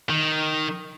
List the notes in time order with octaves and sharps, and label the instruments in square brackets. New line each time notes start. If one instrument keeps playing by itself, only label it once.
[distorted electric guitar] D#3